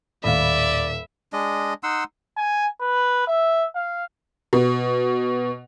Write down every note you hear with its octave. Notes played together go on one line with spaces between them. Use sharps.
D#1 D#2 A2 D5 E5 F5 B5
G#3 D4 D#5
D#4 F#5 C6 E6
G#5
B4
E5
F5
B2